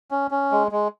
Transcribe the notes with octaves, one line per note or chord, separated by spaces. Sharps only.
C#4
C#4
G#3
G#3